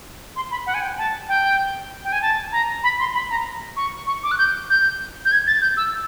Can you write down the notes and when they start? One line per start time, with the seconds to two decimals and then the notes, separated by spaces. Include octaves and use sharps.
0.36 C6
0.51 B5
0.66 F#5
0.74 G#5
0.82 G5
0.98 A5
1.28 G5
2.04 G5
2.12 G#5
2.22 A5
2.52 A#5
2.83 B5
3.00 C6
3.14 B5
3.30 A#5
3.76 C#6
4.07 C#6
4.23 D6
4.31 F#6
4.38 G6
4.70 G6
5.25 G6
5.32 G#6
5.47 A6
5.62 G6
5.77 E6